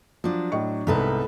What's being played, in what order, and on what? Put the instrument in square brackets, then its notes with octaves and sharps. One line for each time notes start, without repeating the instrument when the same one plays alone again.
[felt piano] F3 [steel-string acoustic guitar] F#3 D4
[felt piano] A2 D#5 C#6
[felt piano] C2 G#2 [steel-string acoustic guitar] B3 A4 B4